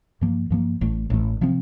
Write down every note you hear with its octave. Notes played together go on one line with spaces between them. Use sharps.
G2 F3 A#3
G2 F3 A#3
A1 A2 A3
A1 A2 A3
C3 F3 C4